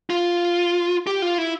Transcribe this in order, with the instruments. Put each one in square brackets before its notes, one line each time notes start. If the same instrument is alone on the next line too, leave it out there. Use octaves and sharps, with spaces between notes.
[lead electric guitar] F4
G4
F4
E4